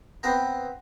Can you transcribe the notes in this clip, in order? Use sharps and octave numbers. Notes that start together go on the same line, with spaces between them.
B3 C4 B4 A#5